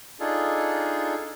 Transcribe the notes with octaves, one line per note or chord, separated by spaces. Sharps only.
D4 D#4 F4 G#4 A4